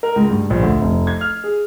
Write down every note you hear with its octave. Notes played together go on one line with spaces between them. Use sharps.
A#4
C#2
G2
A#1
D2
F1
G#6
F6
G#4